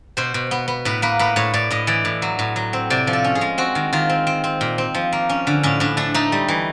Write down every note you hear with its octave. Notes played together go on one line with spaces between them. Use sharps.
B2 C5
B2
B3
B3
A2 B4
A#3 B4
A2 B4
A2 C#5
A2 D5
A2 D#5
E3 D5
A2
F#3
A2
F#3
C4
C3 D5
F3
A4
C#4
G#4
G#3
C4 F#4
D#3
D#3 F4
C4
C4
C4
A#2
C4
F3
A#3
C#4
D3
A2 C#4
A2 D4
A3 D4
A3 D#4
G3
E3